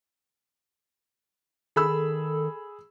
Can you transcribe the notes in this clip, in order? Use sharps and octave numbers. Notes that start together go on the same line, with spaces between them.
D#3 G#4 A4 B5 E6